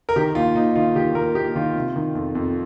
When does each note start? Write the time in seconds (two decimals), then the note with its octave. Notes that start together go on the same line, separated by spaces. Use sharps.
0.09 A#4
0.16 D#3 G4
0.35 D#2 F4
0.56 D#2 D#4
0.76 D#3 F4
0.95 D#3 G4
1.15 D#2 A#4
1.35 D#2 G4
1.55 D#3 F4
1.75 C3
1.96 D#3
2.15 F2
2.35 F2